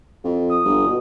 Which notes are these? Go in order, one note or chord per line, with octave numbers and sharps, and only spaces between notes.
F2
D#6
G1
B2